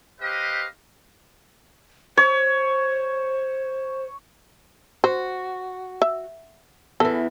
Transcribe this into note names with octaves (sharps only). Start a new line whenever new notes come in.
G4 B4 C5 D#5 F5
C5 C#5
F#4 C5
E5
E2 E3 A4